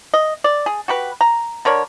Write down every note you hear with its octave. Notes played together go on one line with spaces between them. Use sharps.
D#5
D5
G#4
F#4 G4 B4
A#5
D3 A#4 C#5 D5